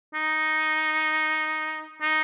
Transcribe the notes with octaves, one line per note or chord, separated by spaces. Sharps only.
D#4
D#4